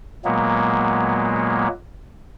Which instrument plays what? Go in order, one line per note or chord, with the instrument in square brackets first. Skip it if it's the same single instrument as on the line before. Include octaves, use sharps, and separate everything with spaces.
[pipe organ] A#2 F#3 G#3 A#3 B3